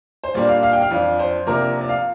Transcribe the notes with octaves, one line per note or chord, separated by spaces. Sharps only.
C5
A#2 G3 A#3 D4 D5
F5
F5
G5
F5
F2 F3 D4
C5
C3 F3 A#3 D4 A#4
D5
F5